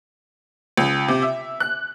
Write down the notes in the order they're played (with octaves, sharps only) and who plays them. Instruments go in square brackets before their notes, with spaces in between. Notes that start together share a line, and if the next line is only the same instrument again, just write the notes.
[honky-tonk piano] C#2
C3
E5
F#6